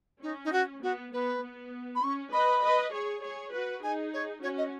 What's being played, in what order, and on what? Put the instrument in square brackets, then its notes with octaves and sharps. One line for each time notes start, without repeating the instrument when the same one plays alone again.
[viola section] C#4 [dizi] D#4
[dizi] D#4
F#4
[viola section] B3 [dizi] F#4
[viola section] B3 [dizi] B4
[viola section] B3
[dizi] B5
[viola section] C#4 [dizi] C#6
[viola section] B4 D#5 [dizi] B5
[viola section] B4 D#5
G#4 C#5
G#4 C#5
F#4 B4
[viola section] D#4 G#4 [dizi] G#5
[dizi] C#5
[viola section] C#4 F#4 [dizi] C#5
[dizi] D#5